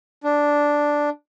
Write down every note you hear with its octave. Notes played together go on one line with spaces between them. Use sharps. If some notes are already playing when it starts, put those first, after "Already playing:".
D4